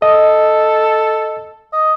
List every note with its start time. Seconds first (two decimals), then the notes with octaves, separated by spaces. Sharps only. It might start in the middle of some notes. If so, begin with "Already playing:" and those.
0.02 A4 D#5
1.73 D#5